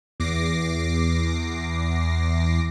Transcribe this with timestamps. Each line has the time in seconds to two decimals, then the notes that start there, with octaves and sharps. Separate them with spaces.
0.20 E2 D6 A#6 C7